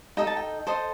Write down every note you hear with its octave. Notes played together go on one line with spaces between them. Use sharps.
D#4 A4 D#5 G5
A5
G5
A4 C5 D#5